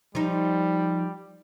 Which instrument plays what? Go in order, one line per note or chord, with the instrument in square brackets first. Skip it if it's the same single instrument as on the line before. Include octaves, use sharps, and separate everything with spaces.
[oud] F3 D#4 [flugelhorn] G3